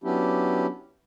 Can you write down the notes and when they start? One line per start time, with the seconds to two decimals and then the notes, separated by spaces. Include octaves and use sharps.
0.04 F#3 B3 C#4 D4 E4 G4